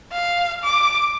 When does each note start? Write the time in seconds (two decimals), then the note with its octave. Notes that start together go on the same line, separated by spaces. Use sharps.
0.12 F5
0.64 D6